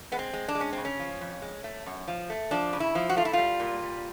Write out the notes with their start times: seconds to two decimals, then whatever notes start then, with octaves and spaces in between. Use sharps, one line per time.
0.12 G#3 B3
0.19 C4
0.33 G#3
0.48 D4
0.55 G#3
0.61 C#4
0.73 C#3 C4
0.85 C#4
1.00 F3
1.21 F2
1.42 G#3
1.64 A3
1.86 F#2
2.08 F3
2.30 A3
2.51 F3 D4
2.73 C#3
2.80 E4
2.95 F3
3.09 F#4
3.16 A3 F4
3.25 E4
3.33 G3 F4
3.60 A#2
3.82 G3